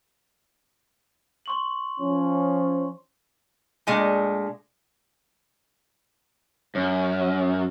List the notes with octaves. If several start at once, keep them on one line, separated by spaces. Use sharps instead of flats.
C6 C#6 F#7
F3 C#4
A#2 G#3 A3 D4
F#2